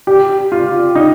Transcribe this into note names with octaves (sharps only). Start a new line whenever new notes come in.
G4
F4
D#4